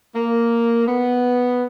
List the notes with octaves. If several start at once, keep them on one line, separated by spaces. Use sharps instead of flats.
A#3
B3